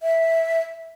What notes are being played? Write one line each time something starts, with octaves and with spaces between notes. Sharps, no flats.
E5